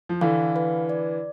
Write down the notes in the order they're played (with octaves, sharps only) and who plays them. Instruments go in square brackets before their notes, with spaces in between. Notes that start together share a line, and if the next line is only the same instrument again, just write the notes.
[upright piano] F3
[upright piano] D3 E3 [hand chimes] F5
[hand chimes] B4
D5